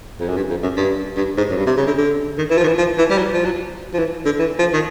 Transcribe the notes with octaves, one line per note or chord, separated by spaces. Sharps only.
F2
F#2
G2
F2
F#2
G2
G2
G#2
F#2
G2
C3
C#3
D3
D3
D#3
E3
F3
D#3
E3
F3
E3
G3
F#3
F3
F#3
F3
E3
D3
E3
F3
D#3